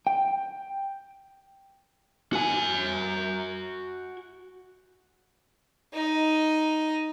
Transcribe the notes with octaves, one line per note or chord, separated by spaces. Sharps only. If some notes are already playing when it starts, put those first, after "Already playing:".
G5
F#4 G#5
D#4 D#5